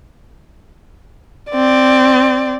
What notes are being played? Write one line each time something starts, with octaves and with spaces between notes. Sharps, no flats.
C4 D5